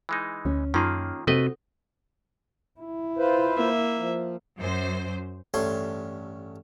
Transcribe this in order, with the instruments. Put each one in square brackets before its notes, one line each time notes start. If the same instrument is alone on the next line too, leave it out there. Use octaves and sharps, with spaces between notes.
[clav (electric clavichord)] E3 G#3 D#4
[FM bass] D2 [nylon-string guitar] C#4
[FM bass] F#2 [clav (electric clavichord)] D#3 A#3 G#4 [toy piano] D#4 F4 C6
[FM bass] C3 [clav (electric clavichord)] A3 B4 D#5 [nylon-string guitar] C4 F#4 [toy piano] A4
[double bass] E4
[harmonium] F4 B4 C5
[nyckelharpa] A#3 E5
[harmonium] F3
[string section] F#2 C5
[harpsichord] A1 G2 A3 C#5 C6